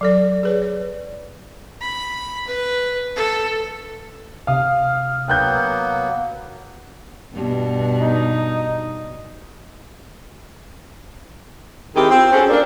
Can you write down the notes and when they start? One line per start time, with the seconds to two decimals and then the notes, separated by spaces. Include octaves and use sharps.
0.01 F#3 A4 D5
0.43 G#4 B4 C#5
0.62 D5
1.81 B5
2.48 B4
3.16 A4
4.47 C3 F5 D#6 F6
5.28 F#3 A#3 B3 G5 F#6 G6
7.33 G2 B2
8.01 D#4
11.95 D#3 C4 D#4 E4 G4 G#4
12.10 C4 F4
12.32 C4 C#4 F#4 G#4 A4 C5
12.49 A#3 D4